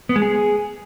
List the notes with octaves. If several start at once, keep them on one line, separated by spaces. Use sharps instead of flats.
B3
G#3
G#4